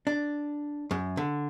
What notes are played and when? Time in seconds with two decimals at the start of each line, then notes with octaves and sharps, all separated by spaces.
0.07 D4
0.91 F#2
1.17 D3